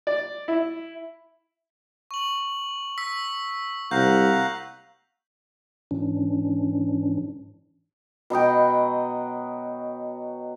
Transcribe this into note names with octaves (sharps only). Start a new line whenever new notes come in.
D5
E4
C#6 F#7
E6 B6
C2 F5 F#5 A#5 G6
G#2 E3 C#4 D4
B2 F#3 D#5 G5